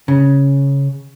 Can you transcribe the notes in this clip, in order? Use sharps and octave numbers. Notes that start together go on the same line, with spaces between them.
C#3